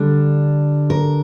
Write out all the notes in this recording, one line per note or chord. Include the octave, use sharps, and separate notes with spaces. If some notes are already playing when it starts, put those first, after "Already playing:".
Already playing: D3 G3 D4
A#4